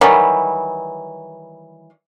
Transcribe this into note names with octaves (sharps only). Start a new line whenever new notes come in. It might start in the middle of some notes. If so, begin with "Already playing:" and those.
D#3 E3 F#3 G3